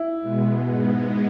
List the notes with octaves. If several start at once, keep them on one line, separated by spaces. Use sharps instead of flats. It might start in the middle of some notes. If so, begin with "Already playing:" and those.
Already playing: E4
B2 G#3 B3
G#2 G#3 B3